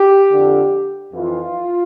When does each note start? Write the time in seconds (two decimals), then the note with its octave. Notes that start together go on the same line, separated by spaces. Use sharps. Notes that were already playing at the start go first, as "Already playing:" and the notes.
Already playing: G4
0.32 F2 D3
1.13 F2 E3 F4